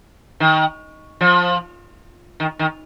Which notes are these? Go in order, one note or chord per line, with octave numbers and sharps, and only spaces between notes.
D#3
F3
D#3
D#3